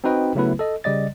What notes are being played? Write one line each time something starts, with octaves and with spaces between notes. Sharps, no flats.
C4 D#4 F#4 B4 D#5 G5
C#3 F#3 A3 B3 E4 B4
A4 D#5
C#3 G3 D5 D#5 A6